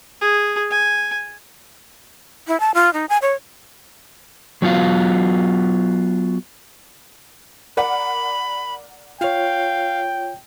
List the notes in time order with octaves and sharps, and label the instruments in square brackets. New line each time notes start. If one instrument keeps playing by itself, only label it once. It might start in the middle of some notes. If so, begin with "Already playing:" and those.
[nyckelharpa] G#4
G#5
[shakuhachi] E4
A5
F4
D#4
G#5
C#5
[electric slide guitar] F#3 B3 F4 F#4 F5
[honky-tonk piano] A#4 D5 F#5 [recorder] B5
[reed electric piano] F4 C#5 [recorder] F5 [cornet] G5